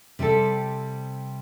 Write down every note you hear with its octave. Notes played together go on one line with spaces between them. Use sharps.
C3 G3 C4 A4